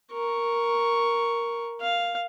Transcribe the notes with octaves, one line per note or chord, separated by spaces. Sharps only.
A#4 C#6
F5